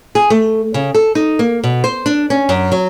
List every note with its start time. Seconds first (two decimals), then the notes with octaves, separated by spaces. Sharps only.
0.15 G#4
0.30 A3
0.74 C#3
0.95 A4
1.15 D#4
1.39 A#3
1.64 B2
1.84 C5
2.06 D4
2.30 C#4
2.49 F#2
2.72 F#3